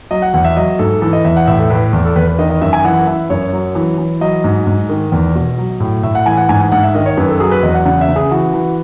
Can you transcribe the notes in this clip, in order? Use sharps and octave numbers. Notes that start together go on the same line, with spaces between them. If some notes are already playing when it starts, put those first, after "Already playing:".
F#3 D#5
F#5
E2 F#5
E5
F#3 D#5
G#2 A4
E3 A4
D#5
E2 E5
F#5
A2 E5
A4
A2 B4
E2
A4
E2 B4
B4
D#3 D#5
D#5
F#2 E5
G#5
E3 F#5
E3 E5
F#2 C#5
F#3
E3
E3
F#3 D#5
G#2
G#2
D#3
E2
B2
F#3
A2
A2 E5
F#5
E3 G#5
F#5
G#2 G#5
F#5
G#2 F#5
E5
D#3 D#5
C#5
F#2 B4
A4
F#3 G#4
B4
E2 D#5
F#5
C#3 F#5
E5
C#3
G#4
E3 F#4
E3